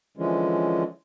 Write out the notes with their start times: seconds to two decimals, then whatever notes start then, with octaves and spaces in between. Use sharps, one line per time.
0.17 D3 E3 F3 G#3 C#4